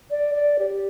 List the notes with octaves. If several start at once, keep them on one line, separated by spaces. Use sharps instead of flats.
D5
D5
G4